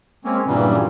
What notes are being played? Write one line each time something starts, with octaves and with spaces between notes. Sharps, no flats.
G#3 A#3 C4 C#4
G2 A#2 C#3 E3 F#3 G3